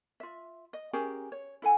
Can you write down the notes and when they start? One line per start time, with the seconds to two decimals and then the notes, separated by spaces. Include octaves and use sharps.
0.20 F4 E5
0.73 D#5
0.93 C#4 G4 G#4 A#4
1.32 C#5
1.62 E4 A4 F#5 G#5